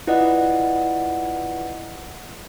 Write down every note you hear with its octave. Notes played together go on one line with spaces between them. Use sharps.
E4 F4 B4 D5 D#5 F#5